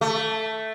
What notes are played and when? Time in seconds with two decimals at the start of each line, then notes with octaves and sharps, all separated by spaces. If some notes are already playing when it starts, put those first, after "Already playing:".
0.01 A3